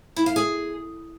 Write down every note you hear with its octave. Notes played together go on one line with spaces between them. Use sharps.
E4
F5
G#4